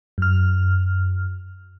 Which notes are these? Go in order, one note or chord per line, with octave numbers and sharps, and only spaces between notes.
F#2 F6